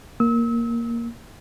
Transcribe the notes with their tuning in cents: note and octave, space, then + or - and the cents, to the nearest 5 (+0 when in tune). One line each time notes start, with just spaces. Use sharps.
A#3 +0 E6 -35